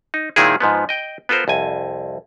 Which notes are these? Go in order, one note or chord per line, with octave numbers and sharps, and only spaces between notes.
D#4
A#2 D#3 G#3 C4 E4 G#4
G#2 F3 B3
D#5 G5
B3 F4 A4 A#4 C5
C2 F2 G#5